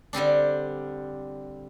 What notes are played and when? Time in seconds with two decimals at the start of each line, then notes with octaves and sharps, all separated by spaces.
0.13 D3 G3 C4 D4